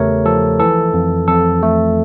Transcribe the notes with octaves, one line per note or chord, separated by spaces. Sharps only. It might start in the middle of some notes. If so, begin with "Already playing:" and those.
Already playing: E2 C#3 A3 G4 A4 A#4 C#5
F3 A4
E3 A4
F2
F2 A4
A3